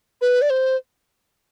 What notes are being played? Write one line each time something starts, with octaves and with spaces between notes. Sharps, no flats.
B4
D5
C5